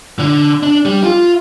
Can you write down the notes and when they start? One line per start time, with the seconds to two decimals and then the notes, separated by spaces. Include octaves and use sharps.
0.19 D3
0.63 D4
0.85 G3
1.03 F4